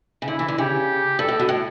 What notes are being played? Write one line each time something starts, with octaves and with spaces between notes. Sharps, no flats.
C#3
D3 E4
E3
D3
C#3 G4
G2 A4
A2
B2
A2